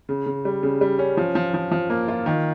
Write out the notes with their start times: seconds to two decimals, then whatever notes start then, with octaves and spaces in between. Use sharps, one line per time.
0.09 C#3
0.26 C#3
0.45 G3
0.63 C#3
0.81 G3
0.99 C#4
1.17 F3
1.35 F3
1.54 F3
1.71 F3
1.90 A#3
2.08 F4
2.26 D#3